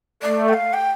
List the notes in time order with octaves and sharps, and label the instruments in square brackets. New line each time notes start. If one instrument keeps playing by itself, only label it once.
[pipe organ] A3 [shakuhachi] D5
[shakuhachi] G5
F5
G5